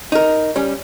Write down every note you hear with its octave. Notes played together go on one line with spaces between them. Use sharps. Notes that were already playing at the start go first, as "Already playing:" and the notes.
D#4 A#4
G3 C#4